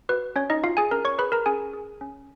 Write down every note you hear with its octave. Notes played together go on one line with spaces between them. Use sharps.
F#4 B4
C#4 C#5
D#4 D#5
F4 F#4 F5
G#4 G#5
C#4 A#4 A#5
C#5 C#6
G#4 B4 B5
A#4 A#5
C#4 G#4 G#5
G#4
C#4